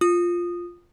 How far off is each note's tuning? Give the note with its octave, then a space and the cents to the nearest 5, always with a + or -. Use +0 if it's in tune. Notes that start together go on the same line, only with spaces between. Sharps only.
F4 +0 D#6 -15